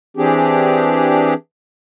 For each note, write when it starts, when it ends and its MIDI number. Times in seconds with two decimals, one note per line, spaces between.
0.17 1.34 52
0.17 1.34 60
0.17 1.34 62
0.17 1.34 67
0.17 1.34 68